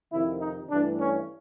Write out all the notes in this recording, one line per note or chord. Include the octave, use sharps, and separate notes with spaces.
F2 C3 D#3 E4
D#4
G2 E3 A3 D4
C#4